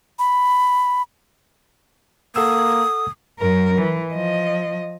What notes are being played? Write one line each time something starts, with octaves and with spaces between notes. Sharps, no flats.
B5
A#3 A4 F#5 D#6 E6
F#2 A#4
E3
F3 D#5